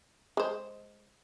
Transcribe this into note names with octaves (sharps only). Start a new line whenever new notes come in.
G#3 C5